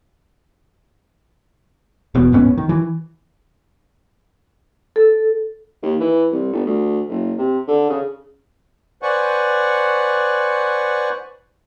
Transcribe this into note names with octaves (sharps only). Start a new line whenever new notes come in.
E1 E2 B2
D1 G#2 B3 C#4
D#3
E3
A4
D#2
E3
C2
G1
D2
F#1
C3
D3
C#3
B4 C5 D5 F#5 G#5 C#6